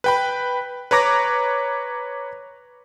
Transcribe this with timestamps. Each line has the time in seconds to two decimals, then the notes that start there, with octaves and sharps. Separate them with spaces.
0.04 B4 G5 B5
0.91 B4 C#5 A#5 D6 A#6